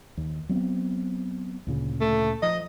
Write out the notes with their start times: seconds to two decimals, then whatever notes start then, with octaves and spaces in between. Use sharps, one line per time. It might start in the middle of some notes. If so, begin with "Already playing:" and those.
0.17 D#2
0.49 F#3 B3 C4
1.67 D2 A#2 C#3
2.01 A3
2.42 F3 D#5